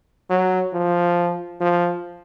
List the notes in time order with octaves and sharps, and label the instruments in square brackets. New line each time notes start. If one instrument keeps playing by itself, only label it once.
[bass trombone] F#3
F3
F3